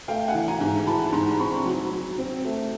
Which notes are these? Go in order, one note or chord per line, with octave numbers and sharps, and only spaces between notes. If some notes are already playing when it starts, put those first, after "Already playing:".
A3 F5 G5
F#5 G#5
E3
G#5 A#5
G#2
E3 A5 B5
G#2 A#5 C6
C4 B5 C#6
F#3
F#3
C4
A3